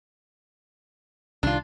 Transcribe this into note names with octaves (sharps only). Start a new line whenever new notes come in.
C2 D#3 D4 F4